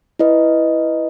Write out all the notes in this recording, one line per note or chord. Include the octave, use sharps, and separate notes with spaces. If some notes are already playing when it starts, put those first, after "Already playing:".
E4 B4 D#5